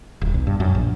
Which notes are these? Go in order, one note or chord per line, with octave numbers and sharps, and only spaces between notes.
D#1
B1
G2
F#2
A#1